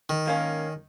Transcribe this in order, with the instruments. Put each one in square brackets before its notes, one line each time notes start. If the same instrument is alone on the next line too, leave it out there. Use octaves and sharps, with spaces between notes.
[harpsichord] D#3
[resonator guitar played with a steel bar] G#2 A#3 C#4